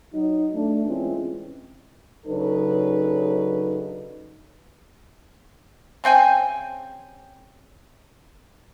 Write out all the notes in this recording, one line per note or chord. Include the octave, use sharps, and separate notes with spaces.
F#3 D#4
A3 D4
E3 G#3 C4 C#4 F4
C#3 F#3 D4 D#4 A4 B4
C#3 C4 G5 G#5